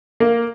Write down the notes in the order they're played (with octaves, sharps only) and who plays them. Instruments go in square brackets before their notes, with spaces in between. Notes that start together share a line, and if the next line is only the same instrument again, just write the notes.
[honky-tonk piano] A#3